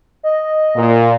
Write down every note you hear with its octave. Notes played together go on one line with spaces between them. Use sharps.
D#5
A#2